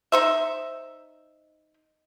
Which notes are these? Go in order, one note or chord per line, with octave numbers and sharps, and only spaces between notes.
D#4 C5 E5